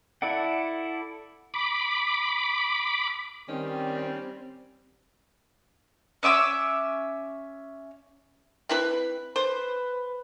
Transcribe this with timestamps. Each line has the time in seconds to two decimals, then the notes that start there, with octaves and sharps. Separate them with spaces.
0.22 E4 A4 D5 F#5
1.54 B5 D6
3.49 D#3 G3 C4 C#4
6.23 C#4 E5 D6 E6
8.69 C4 E4 B4
9.36 B4 C5